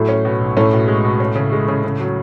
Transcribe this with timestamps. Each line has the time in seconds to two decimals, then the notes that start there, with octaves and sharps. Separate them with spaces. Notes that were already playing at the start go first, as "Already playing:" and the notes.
Already playing: A2 F#3
0.09 C#4
0.25 B2
0.41 B1
0.57 A2 C#4
0.73 B2
0.88 G#3
1.05 B2
1.20 C#4
1.35 C#3
1.52 G#3
1.68 C#3
1.84 C#3
2.00 F#3